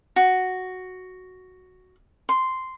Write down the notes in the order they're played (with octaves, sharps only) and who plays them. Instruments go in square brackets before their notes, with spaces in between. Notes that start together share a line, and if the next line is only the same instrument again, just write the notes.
[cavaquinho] F#4
C6